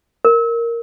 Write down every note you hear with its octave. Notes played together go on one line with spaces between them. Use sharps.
A#4